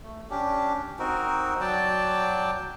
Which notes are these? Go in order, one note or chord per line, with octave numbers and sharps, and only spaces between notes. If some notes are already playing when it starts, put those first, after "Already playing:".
A3
C#4 D4 G4
C4 D#4 F#4 A#4
F#3 D5 G5 A5